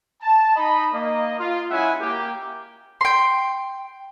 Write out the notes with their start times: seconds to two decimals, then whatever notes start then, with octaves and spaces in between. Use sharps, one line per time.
0.21 A5
0.56 D#4 D#5 B5
0.93 A#3 D#5
1.40 F4
1.70 G#3 C#4 E4 E5 F#5 G#5
2.00 A#3 G4
3.01 G5 C6